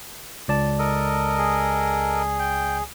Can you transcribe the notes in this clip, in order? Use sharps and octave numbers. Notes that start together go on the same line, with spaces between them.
C#2 D5 A5
A4 A#4 D#5
G#4
G5